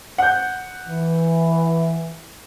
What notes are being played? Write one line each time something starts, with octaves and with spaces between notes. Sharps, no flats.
F#5 G6
E3